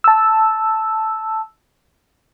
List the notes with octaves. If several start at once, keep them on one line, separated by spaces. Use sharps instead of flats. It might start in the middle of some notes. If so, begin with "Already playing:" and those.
A5 E6